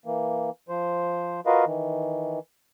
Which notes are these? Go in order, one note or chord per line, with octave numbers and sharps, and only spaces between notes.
E3 A#3
F3 C5
F4 F#4 A#4 B4 D#5 F5
D#3 E3